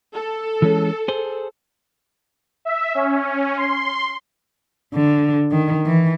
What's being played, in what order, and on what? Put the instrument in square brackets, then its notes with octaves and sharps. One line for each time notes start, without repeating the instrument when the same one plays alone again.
[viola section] A4
[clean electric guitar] E3 G#3 C#4
G#4 C5
[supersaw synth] E5
C#4
C6
[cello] D3
D#3
E3